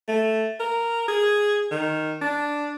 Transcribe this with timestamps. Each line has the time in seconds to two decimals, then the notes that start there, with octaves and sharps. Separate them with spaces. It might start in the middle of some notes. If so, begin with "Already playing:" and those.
0.08 A3
0.60 A#4
1.08 G#4
1.71 D#3
2.21 D4